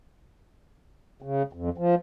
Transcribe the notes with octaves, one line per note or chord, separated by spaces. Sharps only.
C#3
F2
F3